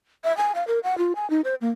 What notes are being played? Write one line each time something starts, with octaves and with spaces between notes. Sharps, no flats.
E5
G#5
F5
A#4
F#5
F4
G#5
D#4
C5
A#3